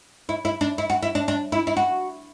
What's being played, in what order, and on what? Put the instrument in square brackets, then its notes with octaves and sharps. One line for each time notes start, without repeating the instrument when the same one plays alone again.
[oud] E4
E4
D4
E4
F#4
E4
D4
D4
E4
E4
F#4